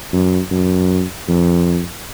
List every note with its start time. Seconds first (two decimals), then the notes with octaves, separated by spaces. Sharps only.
0.13 F#2
0.51 F#2
1.28 F2